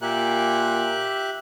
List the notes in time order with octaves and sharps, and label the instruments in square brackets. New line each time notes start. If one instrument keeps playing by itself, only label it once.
[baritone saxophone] A#2 [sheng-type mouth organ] G4 E5 F#6